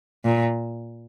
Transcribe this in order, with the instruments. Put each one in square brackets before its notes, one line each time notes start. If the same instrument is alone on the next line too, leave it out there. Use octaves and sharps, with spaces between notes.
[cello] A#2